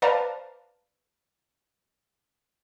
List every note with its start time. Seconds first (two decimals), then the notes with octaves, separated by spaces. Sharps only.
0.02 B4 C5 D5 F5 A5 A#5